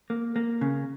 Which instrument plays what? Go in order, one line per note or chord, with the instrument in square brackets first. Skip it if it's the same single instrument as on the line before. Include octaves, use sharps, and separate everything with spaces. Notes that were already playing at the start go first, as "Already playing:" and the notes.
[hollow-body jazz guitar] A#3
A#3
C#3